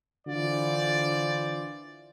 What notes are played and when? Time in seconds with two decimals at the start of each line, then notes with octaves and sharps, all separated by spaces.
0.27 D3 E3 F4 C5 D5